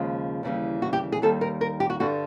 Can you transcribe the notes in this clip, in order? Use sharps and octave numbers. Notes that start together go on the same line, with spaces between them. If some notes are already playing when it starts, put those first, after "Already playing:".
Already playing: D#2 C#3 F3 G#3
D#2 C#3 E3 G3
F#4
G4
G#4
D#2 D#3 G3 A4
A#4
A#4
G4
F#4
G2 D3 G3 F#4